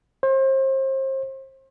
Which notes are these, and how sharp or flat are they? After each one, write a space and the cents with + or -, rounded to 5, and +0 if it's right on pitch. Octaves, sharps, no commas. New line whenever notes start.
C5 +35